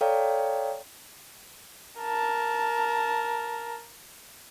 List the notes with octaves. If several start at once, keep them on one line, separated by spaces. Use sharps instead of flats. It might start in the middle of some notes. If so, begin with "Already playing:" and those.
A4 C#5 D5 F5 G5 A#5
A#4 A5